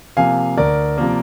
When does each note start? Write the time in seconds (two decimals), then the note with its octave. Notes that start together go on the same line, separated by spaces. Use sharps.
0.17 C3 F3 A#3 F5 G#5
0.57 D2 A#4 D5
0.98 C3 F3 A#3